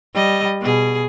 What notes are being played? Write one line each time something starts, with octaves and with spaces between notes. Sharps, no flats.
G3 D#5
B2 G#4